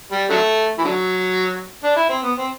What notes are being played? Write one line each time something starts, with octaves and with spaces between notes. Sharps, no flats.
G3
D3 F#3 A3
E3
D3 F#3
D4
E4
C4
B3
C4